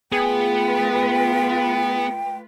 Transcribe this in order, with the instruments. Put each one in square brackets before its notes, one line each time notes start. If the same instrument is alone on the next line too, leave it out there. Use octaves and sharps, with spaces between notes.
[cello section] A3 F4 B4 [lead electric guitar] B3 [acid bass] G#4 [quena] G5